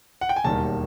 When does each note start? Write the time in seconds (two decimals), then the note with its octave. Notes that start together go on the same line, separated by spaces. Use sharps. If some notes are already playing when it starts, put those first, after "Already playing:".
0.21 F#5
0.29 G5
0.36 G#5
0.44 E1 D#2 D#3 G3 A5